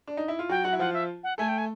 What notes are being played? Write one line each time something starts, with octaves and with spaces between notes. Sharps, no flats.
D4
D#4
E4
F4
F#3 F#4 G5
F#3 F#4 F#5
E4
F3 F4 F#5
E5
F#5
A3 A4 G#5
G5
G#5